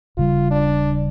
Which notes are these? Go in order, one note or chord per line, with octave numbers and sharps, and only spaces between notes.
D#1 C#3 G3 F4
D4